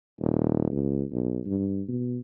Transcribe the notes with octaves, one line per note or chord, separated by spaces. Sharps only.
D#1
C#2
B1
G2
B2